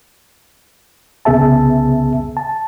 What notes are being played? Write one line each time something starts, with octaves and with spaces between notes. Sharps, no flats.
C2 C#3 B3 G#4 E5 A5
A5